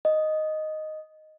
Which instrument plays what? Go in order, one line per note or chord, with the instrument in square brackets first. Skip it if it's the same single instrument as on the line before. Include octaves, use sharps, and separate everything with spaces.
[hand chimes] D#5